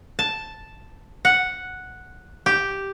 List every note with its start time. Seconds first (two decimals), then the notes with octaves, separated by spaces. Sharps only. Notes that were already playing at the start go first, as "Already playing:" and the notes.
0.19 A5
1.25 F#5
2.46 G4